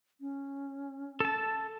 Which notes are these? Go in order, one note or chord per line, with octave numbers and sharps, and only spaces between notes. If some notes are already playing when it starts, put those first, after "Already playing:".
C#4
A4 A5